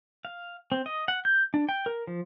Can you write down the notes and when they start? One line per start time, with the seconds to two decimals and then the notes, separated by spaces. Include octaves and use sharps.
0.25 F5
0.72 C4
0.86 D#5
1.08 F#5
1.25 G6
1.54 D4
1.69 G5
1.86 A#4
2.07 F3